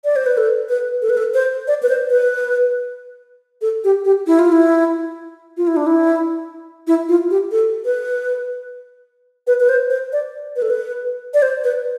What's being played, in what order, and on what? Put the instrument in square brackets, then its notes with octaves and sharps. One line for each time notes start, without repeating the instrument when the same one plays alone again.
[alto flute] D5
C5
B4
A4
B4
A4
B4
A4
C5
D5
B4
C5
B4
A4
G4
G4
E4
F4
E4
F4
E4
D4
E4
E4
F4
G4
A4
B4
B4
B4
C5
C5
D5
B4
A4
B4
D5
C5
B4